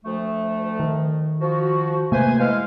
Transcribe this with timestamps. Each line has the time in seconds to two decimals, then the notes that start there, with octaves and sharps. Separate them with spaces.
0.05 D2 F3 A3
0.80 D#3
1.41 F3 F#4
2.12 C3 A3 A#3 B4 C5 G#5
2.40 E3 G#3 F5